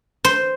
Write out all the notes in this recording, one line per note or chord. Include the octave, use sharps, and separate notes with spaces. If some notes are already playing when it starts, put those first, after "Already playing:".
C5